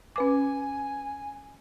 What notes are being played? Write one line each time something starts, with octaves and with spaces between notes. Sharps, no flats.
C#4 B4 G#5 D6